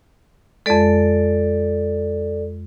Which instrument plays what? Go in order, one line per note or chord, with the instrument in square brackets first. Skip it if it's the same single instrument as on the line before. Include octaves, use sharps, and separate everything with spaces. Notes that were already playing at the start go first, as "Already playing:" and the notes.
[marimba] F2 G#3 [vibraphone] A4 D5